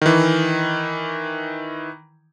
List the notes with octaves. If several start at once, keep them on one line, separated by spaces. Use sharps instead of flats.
D#3 E3